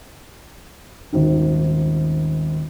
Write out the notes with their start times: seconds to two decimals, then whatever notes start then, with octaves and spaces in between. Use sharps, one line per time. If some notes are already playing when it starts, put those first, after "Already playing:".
1.12 D#1 G#1 D#3